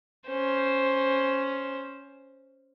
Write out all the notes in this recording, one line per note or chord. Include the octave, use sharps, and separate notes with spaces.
C#4 C5